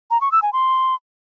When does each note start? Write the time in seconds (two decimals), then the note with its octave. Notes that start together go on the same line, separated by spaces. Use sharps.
0.10 A#5
0.21 C#6
0.32 E6
0.42 G#5
0.53 C6